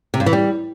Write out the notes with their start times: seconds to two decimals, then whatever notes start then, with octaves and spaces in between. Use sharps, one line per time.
0.14 C3
0.20 G2
0.26 E3
0.33 G3